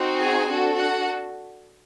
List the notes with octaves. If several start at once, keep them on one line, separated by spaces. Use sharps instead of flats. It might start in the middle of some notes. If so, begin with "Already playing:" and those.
Already playing: C4 D#4 F#4
G#4 G#5
D4 F#4 A4
F#4 F#5